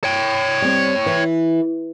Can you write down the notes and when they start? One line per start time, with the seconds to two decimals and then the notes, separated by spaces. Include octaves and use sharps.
0.04 C#5 G5
0.62 G3 C4
1.06 E3